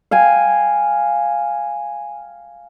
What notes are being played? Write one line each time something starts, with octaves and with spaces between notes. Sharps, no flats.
F5 G5 G#5